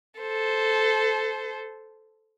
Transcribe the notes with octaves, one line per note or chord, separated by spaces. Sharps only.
A4 C5